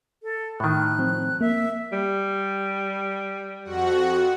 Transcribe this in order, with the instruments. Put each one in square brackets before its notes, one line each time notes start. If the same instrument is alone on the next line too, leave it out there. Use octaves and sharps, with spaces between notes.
[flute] A4
[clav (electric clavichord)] A2 D#3 [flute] F#6
[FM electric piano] F3 C4
[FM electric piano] A#3 [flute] E5
[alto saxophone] G3
[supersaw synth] F2 F#4 F#5